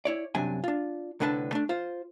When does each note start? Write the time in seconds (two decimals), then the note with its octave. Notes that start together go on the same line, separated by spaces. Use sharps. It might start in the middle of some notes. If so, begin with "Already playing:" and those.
0.05 E4 C#5 D5
0.35 C2 F#2 C3 F#3 D4 G#5
0.64 D4 F4
1.20 C2 A2 D3 D4 B4 A5
1.52 A3 D4
1.69 F4 C5